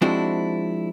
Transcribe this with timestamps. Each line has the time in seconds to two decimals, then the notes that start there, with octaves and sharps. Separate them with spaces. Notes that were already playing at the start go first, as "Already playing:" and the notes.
0.02 F3 G#3 C4 D4 E4 F#4